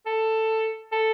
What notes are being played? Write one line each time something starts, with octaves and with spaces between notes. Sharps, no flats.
A4
A4